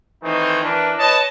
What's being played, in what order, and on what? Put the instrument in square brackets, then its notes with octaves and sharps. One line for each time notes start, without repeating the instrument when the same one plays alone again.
[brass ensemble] D#3 E3 A3 C4 D#4
E3 D4 A#4 B4
B4 C#5 D#5 A5